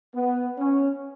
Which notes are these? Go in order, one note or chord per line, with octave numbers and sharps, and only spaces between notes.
B3
C#4